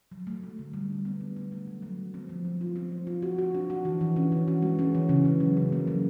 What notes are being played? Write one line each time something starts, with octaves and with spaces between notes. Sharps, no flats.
F#3
A3
A3
D3
G3
D4
B3
G3
A3
A3
F#3
F#3
F3
C4
F3
F3
F4
C4
C4
F4
F#4
F#4
D4
F#4
E3
E3
C#4
E3
F#4
G#3
C#4
E3
C#3
C#3
F#3
C#3
A#3
F#3